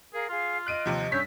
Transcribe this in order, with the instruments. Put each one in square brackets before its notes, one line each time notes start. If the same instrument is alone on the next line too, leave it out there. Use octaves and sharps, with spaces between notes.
[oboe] G#4 [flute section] A#4 F5
[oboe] F4 [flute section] G#4 F5
[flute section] D#5 [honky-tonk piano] F#6 D7 D#7
[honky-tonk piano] D#2 C3 F3
[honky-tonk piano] G2 B6 [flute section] C#4 E6 G6 [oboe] C#5